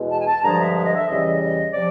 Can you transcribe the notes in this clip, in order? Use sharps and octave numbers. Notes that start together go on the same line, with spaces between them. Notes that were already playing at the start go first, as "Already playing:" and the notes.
Already playing: E2 B2 G#3
A5
G#5
A5
G2 D3 F3 G#3 A#5
E5
E5
D#5
E5
E2 C#3 E3 G3 D#5
D#5
C3 F3 D5